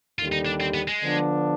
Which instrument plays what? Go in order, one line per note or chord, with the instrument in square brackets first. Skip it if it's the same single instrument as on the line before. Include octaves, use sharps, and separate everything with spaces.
[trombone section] D#2 D3 G3 [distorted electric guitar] F4
[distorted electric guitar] D#4
D4
C4
B3
G#3
[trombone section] D3 F3 B3 D4